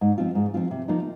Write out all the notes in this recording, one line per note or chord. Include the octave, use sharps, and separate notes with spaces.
G#2
F3 C4 F4
G#2
F3 C4 F4
C3
F3 A#3 D#4